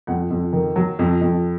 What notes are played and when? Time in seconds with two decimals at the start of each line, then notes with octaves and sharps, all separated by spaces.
0.07 F2 F#5
0.30 F2
0.53 D#3
0.76 F#3
0.99 F2
1.21 F2